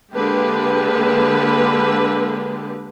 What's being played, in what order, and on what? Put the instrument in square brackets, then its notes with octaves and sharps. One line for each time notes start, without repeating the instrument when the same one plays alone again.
[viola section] D3 G#3 A#3 G4 B4